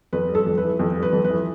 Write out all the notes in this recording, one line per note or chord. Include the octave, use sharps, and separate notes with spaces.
F2 B4
G3
A4
F2
B4
E3
F2
G3
B4
F2
B4
E3